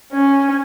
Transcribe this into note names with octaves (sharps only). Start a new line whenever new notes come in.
C#4